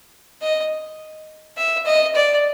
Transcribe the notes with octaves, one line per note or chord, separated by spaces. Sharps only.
D#5
E5
D#5
D5